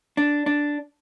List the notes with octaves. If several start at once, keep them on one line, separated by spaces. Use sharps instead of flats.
D4
D4